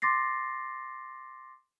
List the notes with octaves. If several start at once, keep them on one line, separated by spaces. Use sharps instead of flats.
C6 D6 A6 A#6 C7